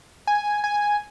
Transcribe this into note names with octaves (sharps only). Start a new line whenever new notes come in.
G#5
G#5